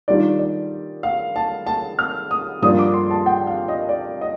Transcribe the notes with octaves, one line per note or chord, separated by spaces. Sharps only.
D#3 G3 D4 F4 D5
D5
F5
A5
A5
F6
D#6
G2 F3 A#3 D4 F4 D#6
D6
C6
A5
G5
F5
D#5
D5
D#5